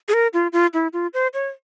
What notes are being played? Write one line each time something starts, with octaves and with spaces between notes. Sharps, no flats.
G#4
A#4
F4
F4
E4
F4
C5
C#5